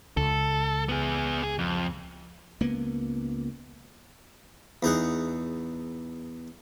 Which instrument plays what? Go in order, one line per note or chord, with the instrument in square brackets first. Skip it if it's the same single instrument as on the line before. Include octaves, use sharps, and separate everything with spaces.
[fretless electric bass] C#2 [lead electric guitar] A4
[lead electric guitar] B3 G#4
G#4
F2
[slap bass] C#2 A#3 B3
[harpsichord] E2 D#4 G#4 F#5